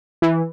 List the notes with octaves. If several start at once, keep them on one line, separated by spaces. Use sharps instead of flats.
E3